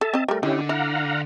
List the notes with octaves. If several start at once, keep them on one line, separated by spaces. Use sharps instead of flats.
A4 E5 A5
C4 D#5
G3 A3 A#4
D3 D#3 C#4 E4 G4
E4 F5 F#5 A#5